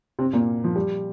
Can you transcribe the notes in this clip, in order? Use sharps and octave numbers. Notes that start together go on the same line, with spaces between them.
C3 C4
A#2 A#3
F3
G3